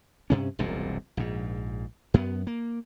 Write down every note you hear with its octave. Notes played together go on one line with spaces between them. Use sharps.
G2 C3 C#4
E1 C2 F#2 A#2
A#1 G#2
F#2 B3
A#3